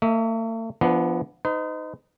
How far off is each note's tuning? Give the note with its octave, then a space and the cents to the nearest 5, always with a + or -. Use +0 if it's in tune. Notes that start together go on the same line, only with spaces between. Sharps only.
A3 +45 E5 -30
F3 -25 B3 +0 D4 +0
D#4 +0 C5 -45